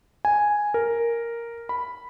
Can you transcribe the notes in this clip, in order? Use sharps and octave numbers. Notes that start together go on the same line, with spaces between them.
G#5
A#4
B5